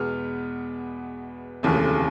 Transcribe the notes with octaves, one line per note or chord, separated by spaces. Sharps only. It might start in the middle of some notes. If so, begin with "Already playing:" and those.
Already playing: E2 B2 G#3 B3 F6
F1 D#2 C#3 E3 A3